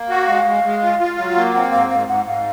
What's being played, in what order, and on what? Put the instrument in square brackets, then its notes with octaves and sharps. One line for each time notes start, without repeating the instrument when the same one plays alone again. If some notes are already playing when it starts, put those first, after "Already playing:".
Already playing: [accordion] A#3
[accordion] F#4 [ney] F5
[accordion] G#3
G#3
G#3
F4
F4
F#3
A#3
[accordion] C4 [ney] F#5
[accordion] G#2 [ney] F5
[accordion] G#2 [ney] F5
[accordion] G#2 [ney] F#5
[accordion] G#2 [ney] F5